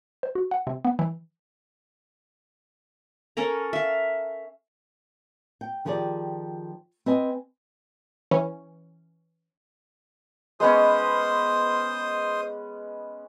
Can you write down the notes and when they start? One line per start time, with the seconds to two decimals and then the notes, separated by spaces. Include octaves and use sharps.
0.23 C5
0.35 F#4
0.51 F#5
0.67 C3
0.85 B3
0.99 E3
3.37 C#4 A4 A#4 A#5
3.73 E5 F5
5.61 G5
5.85 D#3 F3 G4 G#4 C#5 D5
7.06 C4 B4 D#5 G#5
8.31 E3 C#4
10.60 G#3 B3 C#4 C5 C6 D#6